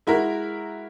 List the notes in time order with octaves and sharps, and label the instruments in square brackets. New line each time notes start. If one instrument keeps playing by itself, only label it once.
[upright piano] G#3 E4 F#4 A#4